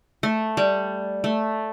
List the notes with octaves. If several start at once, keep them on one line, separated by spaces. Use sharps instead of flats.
A3
G3
A3